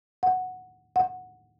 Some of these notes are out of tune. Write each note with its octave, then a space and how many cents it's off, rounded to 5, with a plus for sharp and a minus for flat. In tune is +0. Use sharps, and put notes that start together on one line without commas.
F#5 -5
F#5 -10